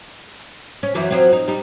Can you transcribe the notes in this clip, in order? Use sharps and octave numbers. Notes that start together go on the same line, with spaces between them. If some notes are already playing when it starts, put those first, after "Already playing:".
C#4
F#2 E3 F#3
F3 F#3 C4
D#4
G3 D#4